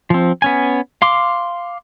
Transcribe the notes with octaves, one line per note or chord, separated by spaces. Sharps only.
F3 C4
B3 C#4 G#5
F5 C6 D6